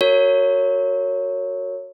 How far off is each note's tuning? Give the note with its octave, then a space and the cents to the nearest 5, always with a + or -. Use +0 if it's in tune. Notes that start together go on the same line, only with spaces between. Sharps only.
F#4 +0 A#4 -30 C#5 +0